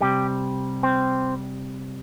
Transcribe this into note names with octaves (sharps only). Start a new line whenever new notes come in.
C3 G3 G4
C4